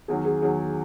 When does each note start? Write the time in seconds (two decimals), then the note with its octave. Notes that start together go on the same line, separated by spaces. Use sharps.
0.08 E2 D#3 F#3 G#4
0.25 G#4
0.42 E2 D#3 F#3 G#4